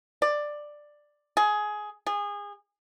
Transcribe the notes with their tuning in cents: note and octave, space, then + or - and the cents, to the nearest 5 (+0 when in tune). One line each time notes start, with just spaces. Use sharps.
D5 +10
G#4 +15
G#4 -25